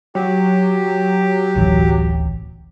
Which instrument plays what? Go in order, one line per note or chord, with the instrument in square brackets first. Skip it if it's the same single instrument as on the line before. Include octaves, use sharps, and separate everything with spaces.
[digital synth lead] F#3 [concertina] G4
[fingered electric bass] D1 A1 E3